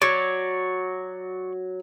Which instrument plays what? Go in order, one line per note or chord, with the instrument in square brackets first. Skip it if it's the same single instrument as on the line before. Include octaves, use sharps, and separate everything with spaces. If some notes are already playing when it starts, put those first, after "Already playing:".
[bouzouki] F#3 [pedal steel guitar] C#5 D5